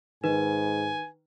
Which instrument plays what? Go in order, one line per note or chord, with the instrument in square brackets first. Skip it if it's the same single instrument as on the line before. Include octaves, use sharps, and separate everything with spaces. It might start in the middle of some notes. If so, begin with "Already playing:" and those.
[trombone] G#2 [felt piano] D#3 [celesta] B4 [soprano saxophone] G#5